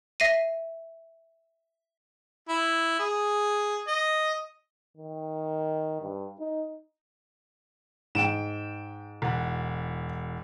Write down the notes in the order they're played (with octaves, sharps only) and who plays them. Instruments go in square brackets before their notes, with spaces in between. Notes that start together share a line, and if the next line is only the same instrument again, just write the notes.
[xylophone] E5 A#6 C7 D#7
[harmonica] E4
G#4
D#5
[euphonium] D#3
G2
D#4
[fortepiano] G#2 [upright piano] G5 D7 E7
[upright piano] E1 F#5